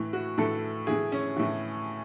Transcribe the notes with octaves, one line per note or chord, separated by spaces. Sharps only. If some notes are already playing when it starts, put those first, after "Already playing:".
Already playing: A2 E3
F#4
A2 E3 A4
A2 E3 G#4
C#4
A2 E3